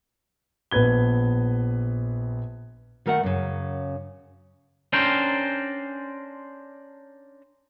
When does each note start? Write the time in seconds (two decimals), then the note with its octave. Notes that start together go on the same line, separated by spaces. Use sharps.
0.71 A#1 B3 B4 G#6 G7
3.06 D#3 A3 A#4 E5 F#5
3.23 F#2 C#3
4.93 C#4 D4 A#4 C5 G5